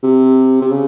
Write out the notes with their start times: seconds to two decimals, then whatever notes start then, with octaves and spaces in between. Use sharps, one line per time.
0.03 C3
0.61 C3
0.71 C#3